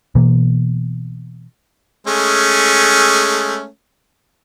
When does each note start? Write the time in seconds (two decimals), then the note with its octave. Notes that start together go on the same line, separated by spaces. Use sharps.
0.15 B2 E3 A#3
2.07 G#3 A3 C#4